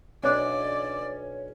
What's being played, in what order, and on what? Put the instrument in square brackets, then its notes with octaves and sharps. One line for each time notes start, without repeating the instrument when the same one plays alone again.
[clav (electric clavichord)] B1 D4 [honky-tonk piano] C#4 [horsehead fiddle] D5